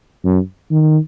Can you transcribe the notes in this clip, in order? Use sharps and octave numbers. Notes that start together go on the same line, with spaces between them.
F#2
D#3